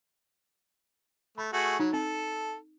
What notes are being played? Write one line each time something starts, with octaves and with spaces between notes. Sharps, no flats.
A3 B5
A3 F#4 G#4
F#3 D#4
C4 A4